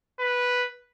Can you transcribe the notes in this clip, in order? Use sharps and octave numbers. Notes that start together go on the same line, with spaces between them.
B4